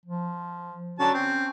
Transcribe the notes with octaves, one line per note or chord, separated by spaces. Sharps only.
F3
D3 F#3 C#4 A5
C4